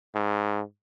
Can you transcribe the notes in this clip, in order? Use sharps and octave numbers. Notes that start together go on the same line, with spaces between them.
G#2